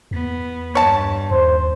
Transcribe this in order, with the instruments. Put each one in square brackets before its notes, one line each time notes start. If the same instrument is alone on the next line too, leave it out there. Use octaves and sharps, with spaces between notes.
[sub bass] E2 [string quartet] B3
[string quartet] G2 [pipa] C#5 A5
[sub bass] D#2 [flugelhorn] C5